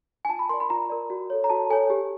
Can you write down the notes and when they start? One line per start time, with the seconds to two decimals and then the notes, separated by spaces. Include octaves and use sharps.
0.25 G#5
0.29 F4 A5
0.39 B5
0.49 A#4 D5 C6
0.60 B5
0.70 F4 A#5
0.90 A#4 D5
1.10 F#4
1.30 A4 C#5
1.44 A#5
1.50 F#4 A5
1.70 A4 C#5 G#5
1.90 G4